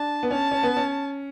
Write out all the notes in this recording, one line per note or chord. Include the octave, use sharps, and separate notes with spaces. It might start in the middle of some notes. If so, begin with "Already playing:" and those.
Already playing: D4 A5
B3
C#4 A5
C#4
B3
C#4